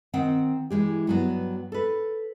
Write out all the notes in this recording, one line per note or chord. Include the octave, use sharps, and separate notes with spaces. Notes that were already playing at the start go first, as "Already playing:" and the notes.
D#3 C4 F#5 G5
E3 G#3 G4
G2 F#3 B3
A4 B4